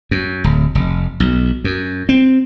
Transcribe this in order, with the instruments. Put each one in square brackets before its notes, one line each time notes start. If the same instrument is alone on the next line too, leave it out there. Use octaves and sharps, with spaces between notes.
[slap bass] F#2
D1
F1
B1
F#2
C4